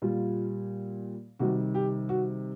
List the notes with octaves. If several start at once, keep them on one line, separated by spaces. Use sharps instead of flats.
A#2 G3 F4
C3 D#3 G3 F#4
G4
F#4